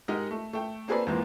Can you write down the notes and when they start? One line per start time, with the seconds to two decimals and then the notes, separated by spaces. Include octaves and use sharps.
0.08 G#3 D#4 G4 A#4 D#5 F#5
0.31 A3
0.53 A3 G5
0.88 A#3 C4 G#4 A4 B4 D5
1.07 E2 E3 F3 G#3 A#3 C4